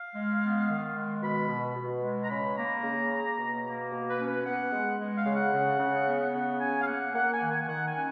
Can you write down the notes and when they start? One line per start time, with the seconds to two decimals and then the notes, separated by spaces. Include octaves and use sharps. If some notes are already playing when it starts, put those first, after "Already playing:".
Already playing: F5
0.15 G#3
0.41 B3
0.69 D#3
0.95 G#3
1.22 B2 B5
1.49 B2
1.76 B2
2.03 G#3
2.24 A#5
2.30 C#3 B5
2.57 A#3 A#5
2.83 C#3
3.11 A#3
3.38 B2
3.64 A#3
3.92 B2
4.10 B4
4.19 C#4
4.28 B4
4.45 B3 F#5
4.73 G#3
4.99 G#3
5.18 F5
5.26 C#3
5.36 F#5
5.54 C#3
5.80 C#3
6.08 B3
6.34 C#3
6.61 C#4 G#5
6.82 F5
6.88 A#3 F#5
7.15 A#3 F#5
7.33 G#5
7.42 D#3
7.51 G#5
7.68 D#3 F#5
7.87 G#5
7.96 C#4